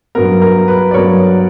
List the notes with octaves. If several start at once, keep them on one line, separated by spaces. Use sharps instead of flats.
G2 F#3 B3 A#4
A#4
B4
D5
G2 F#3 B3 A#4 C#5